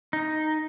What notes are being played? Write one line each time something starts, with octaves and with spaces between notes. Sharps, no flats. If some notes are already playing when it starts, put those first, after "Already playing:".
D#4